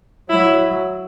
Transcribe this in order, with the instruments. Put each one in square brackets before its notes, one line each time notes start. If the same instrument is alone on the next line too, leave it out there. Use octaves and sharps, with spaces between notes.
[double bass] F#3 [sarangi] E4